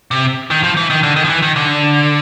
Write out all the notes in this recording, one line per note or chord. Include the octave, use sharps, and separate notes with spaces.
C3
D#3
F3
E3
D#3
D3
D#3
F3
E3
D#3
D3